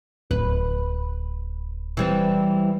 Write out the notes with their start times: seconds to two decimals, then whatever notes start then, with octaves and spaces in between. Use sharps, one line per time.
0.31 D1 B4
1.97 E3 G3 C4